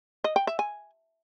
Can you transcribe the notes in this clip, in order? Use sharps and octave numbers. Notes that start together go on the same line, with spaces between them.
D#5
G5
E5
G#5